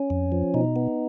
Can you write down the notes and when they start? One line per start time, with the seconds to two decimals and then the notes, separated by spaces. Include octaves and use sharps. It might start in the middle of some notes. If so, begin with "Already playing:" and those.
Already playing: C#4
0.10 F2
0.32 F3
0.54 B2 D#4
0.76 B3